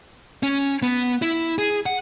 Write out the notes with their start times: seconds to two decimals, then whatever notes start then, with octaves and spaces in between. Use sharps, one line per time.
0.43 C#4
0.82 B3
1.22 E4
1.58 G#4
1.86 F#5